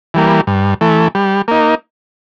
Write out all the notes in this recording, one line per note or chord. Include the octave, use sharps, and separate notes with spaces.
E3 G3 A#3
G2
E3 A3
G3
A#3 D#4